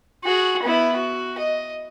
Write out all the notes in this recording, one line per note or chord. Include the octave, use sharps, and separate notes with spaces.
F#4 G#4
B3 E4
F#4
D#5